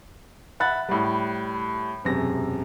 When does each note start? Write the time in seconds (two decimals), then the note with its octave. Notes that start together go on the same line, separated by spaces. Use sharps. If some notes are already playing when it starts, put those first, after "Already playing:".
0.60 E5 F#5 B5 F#6 A6
0.89 A2 G3
2.04 E1 F#2 C3 A#6